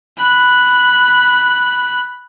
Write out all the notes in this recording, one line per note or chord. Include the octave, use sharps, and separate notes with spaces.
B5 F#6